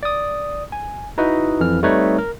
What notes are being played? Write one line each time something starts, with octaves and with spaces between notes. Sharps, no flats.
D5 D#6
G#5
D#4 E4 F#4 B4 D#5
F2 E3 F6
G3 A3 C4 D#4 B4 C#5
A#4